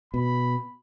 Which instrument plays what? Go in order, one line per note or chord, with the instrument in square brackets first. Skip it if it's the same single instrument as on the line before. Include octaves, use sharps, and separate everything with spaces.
[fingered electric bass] B2 [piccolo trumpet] B5